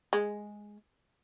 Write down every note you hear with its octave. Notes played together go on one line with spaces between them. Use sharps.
G#3